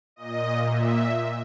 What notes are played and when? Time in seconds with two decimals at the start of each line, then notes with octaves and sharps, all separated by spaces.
0.16 A#2 D#5
0.70 E5